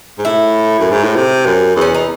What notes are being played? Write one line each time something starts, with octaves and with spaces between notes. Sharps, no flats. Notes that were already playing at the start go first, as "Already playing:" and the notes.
G#2
A2 E4
F#2
G#2
A2
C3
F#2
E2
C#4
D#4